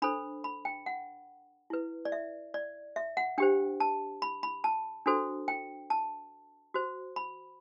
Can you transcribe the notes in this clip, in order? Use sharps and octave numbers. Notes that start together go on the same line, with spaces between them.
D4 A4 C5 B5
B5
G5
F#5
E4 B4
D5
E5
D5
E5
F#5
D4 G4 C5 G5
A5
B5
B5
A5
D4 F#4 A4 C5
G5
A5
F#4 C5
B5